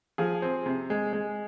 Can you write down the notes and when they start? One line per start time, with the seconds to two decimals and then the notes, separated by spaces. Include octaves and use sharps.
0.18 F3 G#4
0.42 C4
0.66 C3
0.90 G#3
1.13 G#3